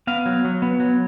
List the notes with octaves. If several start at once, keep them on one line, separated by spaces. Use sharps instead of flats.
B3 F5
F#3
F#3
B3
F#3